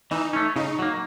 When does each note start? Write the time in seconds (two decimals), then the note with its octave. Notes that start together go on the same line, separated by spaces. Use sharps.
0.11 E3 D#4
0.33 A3 C#4
0.56 C#3 D#4
0.79 F#3 A#3